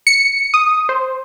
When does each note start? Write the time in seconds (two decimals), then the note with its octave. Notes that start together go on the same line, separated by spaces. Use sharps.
0.07 C#7
0.54 D#6
0.89 C5